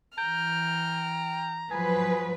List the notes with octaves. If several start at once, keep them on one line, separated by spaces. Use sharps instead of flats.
E3 G5 A#5 F6
F3 F#3 G#4 B4